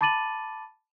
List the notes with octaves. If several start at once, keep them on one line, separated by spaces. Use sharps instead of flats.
A5 B5 D6 A6 D#7 F#7